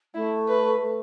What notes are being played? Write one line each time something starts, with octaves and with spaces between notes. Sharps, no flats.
A3 E4
B4
A3